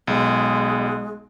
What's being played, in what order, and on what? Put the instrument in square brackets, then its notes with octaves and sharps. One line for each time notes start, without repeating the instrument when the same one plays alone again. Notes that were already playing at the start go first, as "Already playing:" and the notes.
[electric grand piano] B1 [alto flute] G#3